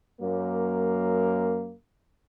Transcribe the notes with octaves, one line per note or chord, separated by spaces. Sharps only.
F#2 F#3 A#3